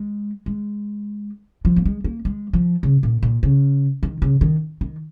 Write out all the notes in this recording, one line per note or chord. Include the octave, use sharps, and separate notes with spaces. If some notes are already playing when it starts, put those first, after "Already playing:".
Already playing: G#3
G#3
F3
A#3
G#3
A#3
G#3
F3
C#3
A#2
A#2
C#3
D#3
C#3
D#3
D#3